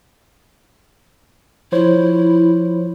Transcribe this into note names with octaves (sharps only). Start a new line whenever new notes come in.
F3 E4 C5 C#5